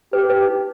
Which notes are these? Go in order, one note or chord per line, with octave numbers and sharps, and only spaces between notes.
G4 B4
B4
D#4